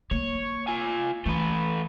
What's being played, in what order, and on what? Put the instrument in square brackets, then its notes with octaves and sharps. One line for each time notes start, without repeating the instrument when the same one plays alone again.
[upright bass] A#3 [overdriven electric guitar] C#5
[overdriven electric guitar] F4 G#5
[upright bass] E3 [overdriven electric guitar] A3 B4